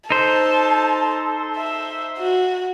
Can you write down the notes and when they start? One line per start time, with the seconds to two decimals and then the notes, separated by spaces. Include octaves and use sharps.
0.10 D#4 A4 C5 A5
1.57 E5
2.18 F#4